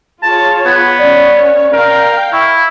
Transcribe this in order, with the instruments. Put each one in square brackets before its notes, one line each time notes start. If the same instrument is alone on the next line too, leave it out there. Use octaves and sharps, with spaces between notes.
[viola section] F4 G#4 C#5 [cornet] A5
[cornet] B3 [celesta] G#6
[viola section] C#4 C#5 [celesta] D5
[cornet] A#4 [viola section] F5 G5
[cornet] E4 [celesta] C#6